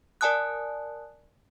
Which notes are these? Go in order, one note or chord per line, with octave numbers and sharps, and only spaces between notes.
A#4 D5 G#5 A5 D#6 F#6